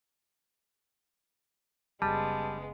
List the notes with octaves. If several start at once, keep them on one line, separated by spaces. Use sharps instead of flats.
F#1 C#3 G3 G#3 B3 A5